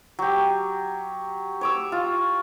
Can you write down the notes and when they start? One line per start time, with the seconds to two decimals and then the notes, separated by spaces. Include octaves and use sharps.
0.19 F#3 G4
1.61 C#5 D6 E6
1.92 F4